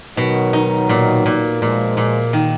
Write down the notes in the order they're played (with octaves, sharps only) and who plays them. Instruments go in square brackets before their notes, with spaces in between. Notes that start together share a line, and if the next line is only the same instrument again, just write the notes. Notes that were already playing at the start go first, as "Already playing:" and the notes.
[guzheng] B2 [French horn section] D#3 F#3
[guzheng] D#4
A#2
A#2
[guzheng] A#2 [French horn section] F3 G#3
[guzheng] A#2
D#3